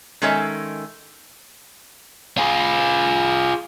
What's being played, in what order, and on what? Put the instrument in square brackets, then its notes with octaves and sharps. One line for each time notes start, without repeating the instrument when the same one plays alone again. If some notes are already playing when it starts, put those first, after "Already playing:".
[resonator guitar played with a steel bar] D#3 G#3 C#4 A4 D#5 E5
[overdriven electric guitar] F4 G#4